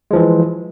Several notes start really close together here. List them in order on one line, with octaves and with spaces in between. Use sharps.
G#3 F3 E3